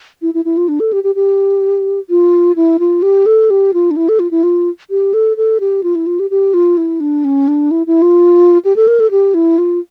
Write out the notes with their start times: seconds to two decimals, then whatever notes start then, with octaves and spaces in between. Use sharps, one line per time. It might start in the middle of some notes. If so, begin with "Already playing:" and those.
0.22 E4
0.34 E4
0.45 E4
0.57 F4
0.68 D4
0.80 A4
0.93 G4
1.04 G4
1.15 G4
2.10 F4
2.56 E4
2.79 F4
3.02 G4
3.26 A4
3.50 G4
3.74 F4
3.91 D4
3.96 E4
4.09 A4
4.19 F4
4.31 E4
4.43 F4
4.90 G4
5.14 A4
5.37 A4
5.60 G4
5.83 F4
5.95 E4
6.06 F4
6.19 G4
6.30 G4
6.54 F4
6.77 E4
7.00 D4
7.25 C#4
7.48 D4
7.71 E4
7.87 E4
8.02 F4
8.65 G4
8.76 A4
8.87 A#4
9.00 A4
9.11 G4
9.34 E4
9.58 F4